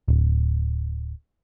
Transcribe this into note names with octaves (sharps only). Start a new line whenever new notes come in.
D1